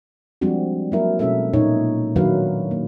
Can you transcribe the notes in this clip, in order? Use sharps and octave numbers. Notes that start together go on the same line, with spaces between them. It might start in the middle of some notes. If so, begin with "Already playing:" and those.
F3 G3 G#3 C4 D4 F#4
F#3 A#3 E4 A#4
B2 G#3 C#4 E4 A4 E5
A#2 D#4 C#5
D#3 F#3 D4 E4 B4 F5
A#3